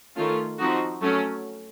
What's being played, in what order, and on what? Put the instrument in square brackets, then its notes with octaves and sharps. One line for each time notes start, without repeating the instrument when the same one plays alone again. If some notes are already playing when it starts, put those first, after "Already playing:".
[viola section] D#3 A3 C#4 F4
F3 C4 D#4 F#4
F#3 A3 C#4